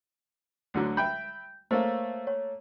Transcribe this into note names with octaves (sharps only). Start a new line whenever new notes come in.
D2 D3 F#3
E5 G5 B5 G6
A3 A#3 C5 C#5 F5
C#5